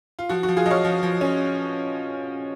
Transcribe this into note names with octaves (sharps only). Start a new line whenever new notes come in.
F4
F3 F#4
F#4
F3
F4 G#4
F3 C#5 D#5 F5
F3
F3
C#4